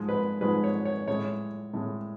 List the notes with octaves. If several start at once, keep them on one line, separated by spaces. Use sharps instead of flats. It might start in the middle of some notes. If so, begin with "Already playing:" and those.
Already playing: G#2 F3 G#3
B4
G#2 F3 G#3 B4
C#5
C#5
A2 G#3 C#5
A2 G#3